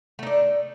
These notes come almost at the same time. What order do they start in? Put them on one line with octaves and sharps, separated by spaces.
A3 D#4 D4